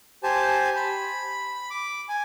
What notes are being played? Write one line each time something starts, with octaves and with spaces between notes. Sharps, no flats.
G4 C5 G#5 A5
B5
D6
G#5